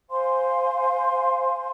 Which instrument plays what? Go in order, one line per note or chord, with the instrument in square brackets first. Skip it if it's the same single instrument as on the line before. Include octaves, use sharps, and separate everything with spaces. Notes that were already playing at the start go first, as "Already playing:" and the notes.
[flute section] C5 F5 G#5 C6